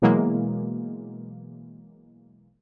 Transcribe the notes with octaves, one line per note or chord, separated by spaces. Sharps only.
B2 E3 F#3 G#3 A#3